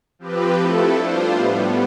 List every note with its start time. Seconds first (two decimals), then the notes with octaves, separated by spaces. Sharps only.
0.19 F3 C4 G4 B4
0.57 F3 A3 E4 A4
0.95 G3 D4 F4 C5
1.32 A2 G3 B3